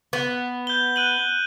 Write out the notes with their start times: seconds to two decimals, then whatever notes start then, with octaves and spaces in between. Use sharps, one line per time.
0.13 B3
0.67 G6 G7
0.96 F#6 D#7 F#7